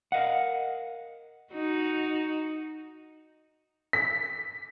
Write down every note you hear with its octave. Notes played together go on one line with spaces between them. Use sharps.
A#4 D#5 F5 F#5
D#4 F#4
B6